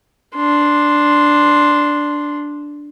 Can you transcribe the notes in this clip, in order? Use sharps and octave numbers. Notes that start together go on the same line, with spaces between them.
D4 C6